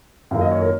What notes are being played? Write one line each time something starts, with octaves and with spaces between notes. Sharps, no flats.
F#2 D#3 A#3 F5
D#5
C#5
A#4